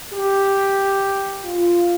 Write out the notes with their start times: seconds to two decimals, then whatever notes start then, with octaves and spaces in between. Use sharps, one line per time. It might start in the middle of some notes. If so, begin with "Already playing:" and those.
0.13 G4
1.44 F4